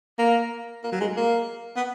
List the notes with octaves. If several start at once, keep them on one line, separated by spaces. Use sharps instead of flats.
A#3
A#3
F#3
G#3
A#3
B3